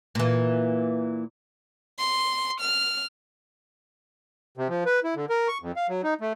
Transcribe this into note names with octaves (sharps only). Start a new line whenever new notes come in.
A#2 E3
C6
F6
C3
F3
B4
E4
D3
A#4
C#6
F2
F5
F#3
D#4
A3